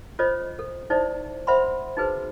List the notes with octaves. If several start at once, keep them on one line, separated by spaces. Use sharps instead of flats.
F4 A4 C5 C#5 D#5
A4
D#4 E4 A4 C5 D5 E5
C5 E5 F#5 B5 C6
D#4 F#4 G#4 B4 C5